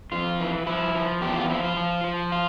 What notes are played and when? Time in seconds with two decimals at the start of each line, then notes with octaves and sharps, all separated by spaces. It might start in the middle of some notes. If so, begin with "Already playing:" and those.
0.12 F2 F4
0.40 E3
0.67 F3 E4
0.95 F3
1.21 E2 G4
1.36 F4
1.49 F3 E4
1.64 F4
1.77 F3
2.04 F3
2.32 F4